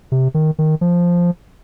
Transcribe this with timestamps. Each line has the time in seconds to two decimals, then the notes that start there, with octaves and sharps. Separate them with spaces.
0.12 C3
0.34 D#3
0.59 D#3
0.81 F3